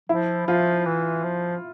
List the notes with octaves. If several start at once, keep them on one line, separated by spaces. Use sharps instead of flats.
F3 E4
F3 F4
E3
F3